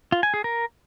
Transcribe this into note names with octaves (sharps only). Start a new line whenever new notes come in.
F4
G#5
G#4
A#4